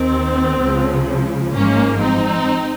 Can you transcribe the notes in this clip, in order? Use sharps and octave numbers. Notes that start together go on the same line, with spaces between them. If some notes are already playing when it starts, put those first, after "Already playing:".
Already playing: D#2 D#3 C4
C#2 C#3 F3
G#1 G#2 F3 A#3 C#4
C4 D#4